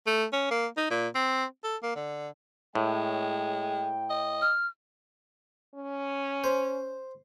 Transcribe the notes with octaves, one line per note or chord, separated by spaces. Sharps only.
A3
C#4
A#3
D#4
A#2
C4
A4
A#3
D3
A2 G#3 G5
D#5
F6
C#4
C5